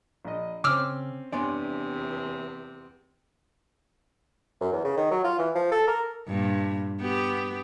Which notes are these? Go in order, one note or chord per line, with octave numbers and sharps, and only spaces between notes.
A#1 D#5
C#3 C4 C#4 D6 E6 F6
E2 C3 B3 D4 C#5 D5 G#5 C6
F#2
E2
C#3
D#3
F#3
F4
E3
F3
A4
A#4
G2 A#2
B3 G4